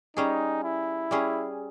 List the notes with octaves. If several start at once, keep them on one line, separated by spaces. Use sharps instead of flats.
G3 C#4 D#4 G#4
E4
G3 C#4 G#4